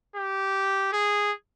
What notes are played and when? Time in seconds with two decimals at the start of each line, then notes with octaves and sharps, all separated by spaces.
0.16 G4
0.92 G#4